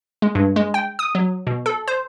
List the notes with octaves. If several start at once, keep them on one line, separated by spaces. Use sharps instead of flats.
G#3
G2
G#3
G5
D#6
F#3
B2
A4
C5